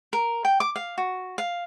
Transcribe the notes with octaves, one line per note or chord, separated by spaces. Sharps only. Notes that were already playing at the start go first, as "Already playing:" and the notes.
A#4
G5
D6
F5
F#4
F5